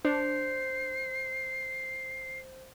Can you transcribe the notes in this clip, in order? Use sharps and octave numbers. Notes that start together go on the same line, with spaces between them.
D4 C5 C7